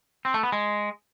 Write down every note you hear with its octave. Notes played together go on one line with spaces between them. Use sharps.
C4
A3
B3
G#3